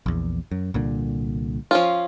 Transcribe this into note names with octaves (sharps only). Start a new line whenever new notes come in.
A#1 E2
F#2
C2 A#2 D3
F3 C#4 F4